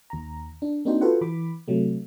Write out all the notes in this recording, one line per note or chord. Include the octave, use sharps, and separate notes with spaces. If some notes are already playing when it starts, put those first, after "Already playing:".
D#2 A#5
D4
A#3 C4 D4 D#4 F#4 C5
F4 F#4 A4 B4 C5 F#5
E3 B5 D6
C3 F#3 A3